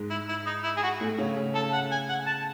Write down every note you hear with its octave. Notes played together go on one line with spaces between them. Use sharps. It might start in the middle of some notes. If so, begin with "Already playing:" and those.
Already playing: G#2 G#3
E4
E4
D#4
E4
G#4
F#4
A2 A3
C#3 C#4
C#3 C#4
C#3 C#4 A4
F#5
G#5
F#5
A5